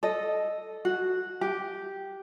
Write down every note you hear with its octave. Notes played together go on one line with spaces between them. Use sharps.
A4 D#5
F#4
G4